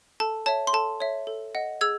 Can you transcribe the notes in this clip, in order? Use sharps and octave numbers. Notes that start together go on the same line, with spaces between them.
A4 A5
C#5 E5 A5
C6
A4 A5
C#5 E5
A4
D#5 F#5
G#4 E6 G#6